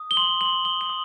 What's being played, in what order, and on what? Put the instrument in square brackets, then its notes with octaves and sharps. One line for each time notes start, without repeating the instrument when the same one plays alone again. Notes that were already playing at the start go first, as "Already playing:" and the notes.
Already playing: [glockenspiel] D#6
G7
C6 F#7
C6 F#7
D#6 G7
F#7
D#6